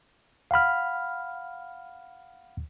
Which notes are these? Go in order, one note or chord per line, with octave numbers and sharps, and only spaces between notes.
F5 F#5 B5 F6